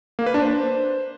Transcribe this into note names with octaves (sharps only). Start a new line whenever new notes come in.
A#3
B4
D4
C5